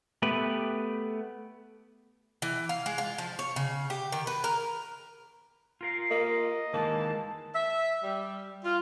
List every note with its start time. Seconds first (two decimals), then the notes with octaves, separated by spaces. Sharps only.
0.22 A3 B3 G4 B4
2.42 E3
2.69 F5
2.86 G#3
2.98 F4
3.18 F3
3.39 C#5
3.56 C#3
3.90 G4
4.12 D#3
4.27 B4
4.44 A#4
5.81 F4 A#4 F5
6.11 A#3 D#5
6.73 D#3 E3 G#3 A#3 A5
7.54 E5
8.03 G3
8.64 F4